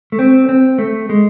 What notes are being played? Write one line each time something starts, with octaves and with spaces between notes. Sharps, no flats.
A3
C4
C4
A3
G#3